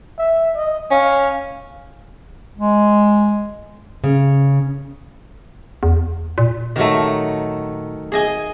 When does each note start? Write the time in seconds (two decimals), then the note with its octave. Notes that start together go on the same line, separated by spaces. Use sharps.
0.18 E5
0.56 D#5
0.91 C#4 F5
2.58 G#3
4.04 C#3
5.83 E2
6.38 A#2
6.76 D#3 F#3 A3
8.12 G#4 D#5 G#5